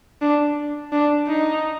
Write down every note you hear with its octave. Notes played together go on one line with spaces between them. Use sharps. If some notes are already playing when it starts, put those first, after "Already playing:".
D4
D4
D#4